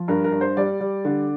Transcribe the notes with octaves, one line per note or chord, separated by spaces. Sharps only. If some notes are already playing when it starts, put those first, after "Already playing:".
Already playing: F3
G2 A#4
A#4
G2
C5
G3 D5
G3
D3